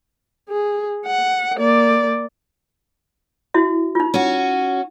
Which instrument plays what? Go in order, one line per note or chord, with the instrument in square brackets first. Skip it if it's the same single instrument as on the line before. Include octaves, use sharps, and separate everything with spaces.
[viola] G#4
F#5
A#3 D5
[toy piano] E4 F#4 E5
D#4 F4
[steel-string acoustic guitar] C#4 F#4